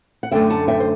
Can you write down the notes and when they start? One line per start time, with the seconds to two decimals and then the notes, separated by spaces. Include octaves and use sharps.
0.23 F#5
0.32 F#2 D3 A3 E5 G5
0.50 F#5 A5
0.68 E5 G5
0.80 C5